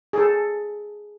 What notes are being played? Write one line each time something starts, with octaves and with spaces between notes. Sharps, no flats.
G#4 A4